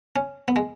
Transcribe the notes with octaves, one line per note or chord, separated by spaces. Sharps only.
C#4
B3
G#3